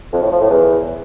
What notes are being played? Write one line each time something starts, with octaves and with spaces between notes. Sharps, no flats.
F2
A2
F3
A2
E2